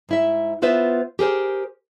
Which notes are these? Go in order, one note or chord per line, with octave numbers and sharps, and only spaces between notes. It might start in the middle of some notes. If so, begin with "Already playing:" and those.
G#2 E4 E5
B3 F4 B4 C5 E5
G4 G#4 A#4 C5